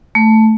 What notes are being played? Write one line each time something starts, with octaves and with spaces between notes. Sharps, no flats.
A3